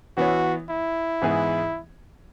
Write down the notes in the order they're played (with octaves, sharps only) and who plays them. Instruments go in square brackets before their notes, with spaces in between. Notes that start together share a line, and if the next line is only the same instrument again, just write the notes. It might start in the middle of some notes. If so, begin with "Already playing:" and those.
[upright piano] E3 B3 E4 C#5 [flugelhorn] F#4
[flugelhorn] E4
[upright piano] G#2 E3 B3 G#4